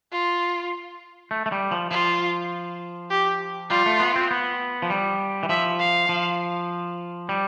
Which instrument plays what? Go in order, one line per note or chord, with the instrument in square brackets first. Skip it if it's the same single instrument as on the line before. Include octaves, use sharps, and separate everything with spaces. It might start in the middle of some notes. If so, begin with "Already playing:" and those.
[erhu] F4
[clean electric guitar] A3
A3
G3
F3
[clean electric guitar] F3 [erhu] F4
[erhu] G4
[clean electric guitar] G3 [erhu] F4
[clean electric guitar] A3
B3
C4
B3
F3
G3
E3
[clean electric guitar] F3 [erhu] E5
[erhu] F5
[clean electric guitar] F3
G3